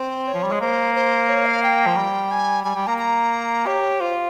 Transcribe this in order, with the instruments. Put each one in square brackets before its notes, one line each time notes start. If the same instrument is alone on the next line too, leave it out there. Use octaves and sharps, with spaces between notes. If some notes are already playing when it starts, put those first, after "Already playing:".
Already playing: [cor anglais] C4 [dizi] C5
[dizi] C#5
[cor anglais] F3
G3
G#3
[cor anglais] A#3 [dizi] C5
[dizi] C5
C#5
F5
G5
[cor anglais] F3
G3
[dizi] G#5
[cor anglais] G3 [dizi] G#5
[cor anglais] G3 [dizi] G5
[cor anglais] A#3 [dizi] A#5
[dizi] A#5
[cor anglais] G4 [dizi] C#5
[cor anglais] F4 [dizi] C5